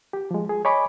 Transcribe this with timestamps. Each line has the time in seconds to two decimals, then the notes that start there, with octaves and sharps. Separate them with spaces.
0.13 G4
0.31 F3 G#3
0.49 G#4
0.65 C#5 D#5 G#5 B5 D6